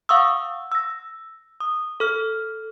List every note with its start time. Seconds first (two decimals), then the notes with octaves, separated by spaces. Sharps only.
0.09 F5 F#5 C#6 D#6 E6
0.72 E6 A#6
1.60 D#6
2.00 A4 F6